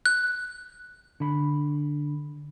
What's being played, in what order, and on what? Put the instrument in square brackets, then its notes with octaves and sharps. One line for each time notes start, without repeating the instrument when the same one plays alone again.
[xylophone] F#6
[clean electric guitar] D3 B5